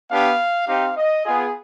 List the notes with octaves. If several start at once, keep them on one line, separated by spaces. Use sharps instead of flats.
B3 D4 G4 F5
C4 D#4 G4 F5
D#5
B3 F4 G#4